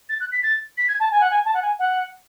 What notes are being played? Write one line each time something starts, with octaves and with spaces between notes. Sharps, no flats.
A6
F#6
B6
A6
B6
G#6
A5
G#5
F#5
G#5
A5
F#5
G#5
F#5